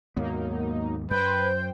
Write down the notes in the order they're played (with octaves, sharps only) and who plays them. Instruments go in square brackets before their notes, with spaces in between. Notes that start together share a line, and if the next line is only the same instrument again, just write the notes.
[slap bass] D#2 G#2 B3 [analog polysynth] F#3 A#3 D#4
[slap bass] F#2 [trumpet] B4 [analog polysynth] C5 G5 [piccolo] G6